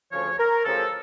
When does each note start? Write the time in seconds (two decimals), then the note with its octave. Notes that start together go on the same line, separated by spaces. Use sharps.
0.12 D2 C#3 F3 C#5
0.39 A#4
0.65 D2 C#3 F3 A4